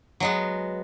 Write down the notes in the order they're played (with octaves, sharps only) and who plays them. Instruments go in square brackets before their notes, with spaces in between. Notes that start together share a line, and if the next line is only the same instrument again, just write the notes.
[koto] F#3 G#3 B3